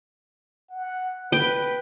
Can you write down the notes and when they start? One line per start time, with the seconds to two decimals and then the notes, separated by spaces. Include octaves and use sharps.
0.71 F#5
1.32 B4 G5